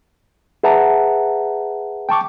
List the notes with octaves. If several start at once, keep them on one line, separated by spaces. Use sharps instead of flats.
G#4 B4 E5 F#5 A5 A#5
G5 A5 C#6 D6